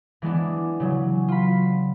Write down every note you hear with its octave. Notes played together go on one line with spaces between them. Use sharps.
E3 G#3 B3 D4
C#3 F#3
F4 B5